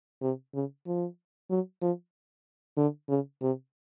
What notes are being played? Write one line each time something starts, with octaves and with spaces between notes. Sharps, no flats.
C3
C#3
F3
F#3
F3
D3
C#3
C3